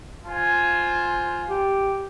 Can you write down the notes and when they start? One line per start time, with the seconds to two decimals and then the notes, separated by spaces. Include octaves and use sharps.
0.25 F4 C5 G#5
1.49 G4